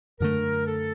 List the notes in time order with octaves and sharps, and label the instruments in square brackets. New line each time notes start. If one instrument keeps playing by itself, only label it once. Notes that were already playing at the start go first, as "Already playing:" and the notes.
[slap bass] F#2 D3 A3 [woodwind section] A#4
[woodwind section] A4